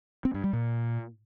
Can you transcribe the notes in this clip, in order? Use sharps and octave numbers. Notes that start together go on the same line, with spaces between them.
C4
G2
G3
A#2